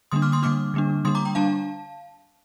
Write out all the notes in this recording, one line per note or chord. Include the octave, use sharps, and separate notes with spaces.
D3 G3 A#3 D4 C6 D#6
D6 F6
C6 D#6
D3 G3 A#3 D4 D6 F6
D3 G3 A#3 D4
D3 G3 A#3 D4 C6 D#6
A#5 D6
G5 A#5
G3 D4 F5 A5